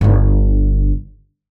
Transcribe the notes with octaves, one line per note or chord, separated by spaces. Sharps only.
G1 D3